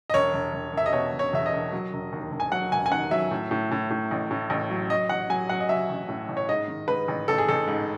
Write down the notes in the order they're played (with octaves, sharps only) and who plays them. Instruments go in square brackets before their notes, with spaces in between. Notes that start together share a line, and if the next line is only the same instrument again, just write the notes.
[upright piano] D#5
E1 C#5
E1
E1
E1 E5
D#5
B2 C#5
E1
C#5
E2 E5
D#5
E1
F#3
E1
D#2
E1
G#5
F#3 F#5
E1 G#5
G#5
D#3 F#5
F#3 E5
A2
A2
A2
A2
A1
A2
A1
F#3
F#3 D#5
A1 F#5
F#3 G#5
F#3 F#5
D#5
F#3 E5
A1
A2
A1
C#5
G#2 D#5
D#3
G#2 B4
A1
A1 A4
G#4
A1 A4
G#2